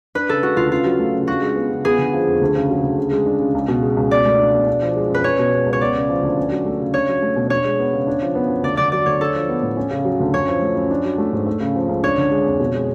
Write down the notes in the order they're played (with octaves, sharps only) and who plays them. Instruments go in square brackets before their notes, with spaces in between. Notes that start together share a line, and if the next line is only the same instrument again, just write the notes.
[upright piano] D4 [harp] B4
[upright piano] C#3 [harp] A4
[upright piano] G#3 [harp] F#4
[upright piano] D2 [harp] F4
[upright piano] C#3 [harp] F4
[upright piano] F#3
A3
C#3
[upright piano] D4 [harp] F#4
[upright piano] G#3
B3
C#3
[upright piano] B3 [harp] G#4
[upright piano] D3
F3
F2
D2
C#3
F#3
D2
C#3
G#3
D4
C#3
C#2
B2
G#3
C#2
[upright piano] B2 [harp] D5
[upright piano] A3
D4
B2
D4
F3
G#3
[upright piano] F#2 [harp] B4
[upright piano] C#4 [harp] C#5
[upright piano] B2
G#3
C#2
[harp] C#5
[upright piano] B3 [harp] D5
[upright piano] C#3
F3
D2
C#4
F#3
A3
C#3
[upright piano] D4 [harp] C#5
[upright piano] F#3
A3
B2
[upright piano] D4 [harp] C#5
[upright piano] G#3
B3
C#3
D4
F3
B3
F#2
[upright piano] D2 [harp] D5
[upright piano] D3 [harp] D5
[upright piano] F#3 [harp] D5
[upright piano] D2 [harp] C#5
[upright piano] D4 [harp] A4
[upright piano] F3
B3
A2
C#4
C#3
F#3
D2
[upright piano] F#2 [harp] C#5
[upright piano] F3
A3
F#2
D4
F#3
A3
G#2
A3
C#3
F3
C#2
[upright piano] D4 [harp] C#5
[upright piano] D3
G#3
F2
B2
G#3